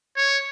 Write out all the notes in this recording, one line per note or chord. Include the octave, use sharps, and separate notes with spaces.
C#5